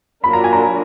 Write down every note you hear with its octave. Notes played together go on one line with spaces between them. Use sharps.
F#3 A#3 D4 F4 A#4 B5
A#5
G#5
A#5